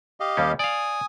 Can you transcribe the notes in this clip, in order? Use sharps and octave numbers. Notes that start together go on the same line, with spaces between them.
G4 D#5 F5
D#2 G3 C#4
D5 F5 G#5 D#6